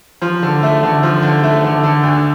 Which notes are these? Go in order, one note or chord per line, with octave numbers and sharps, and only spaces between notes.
F3
D3
A3
D3
F3
D3
A3
D3
D3
D2